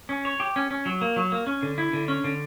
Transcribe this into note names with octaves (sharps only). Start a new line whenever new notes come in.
C#4
C#5
G4
C#4
C#4
F#3
A#3
F#3
A#3
C#4
D3
E4
D3
C#4
D3